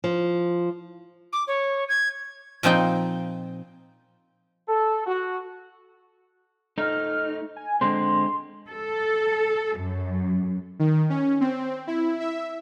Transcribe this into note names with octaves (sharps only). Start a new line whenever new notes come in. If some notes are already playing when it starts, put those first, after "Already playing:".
F3
D6
C#5
G#6
A#2 F3 C4 D#4 G5
A4
F#4
A3 D#4 F6
G#5
D3 G#3 C4 C6
A4
F#2
D#3
C#4
C4
E4
E5